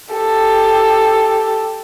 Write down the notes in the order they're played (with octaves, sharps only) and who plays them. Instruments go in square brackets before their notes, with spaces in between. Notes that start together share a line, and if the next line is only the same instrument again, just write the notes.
[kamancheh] G4 A4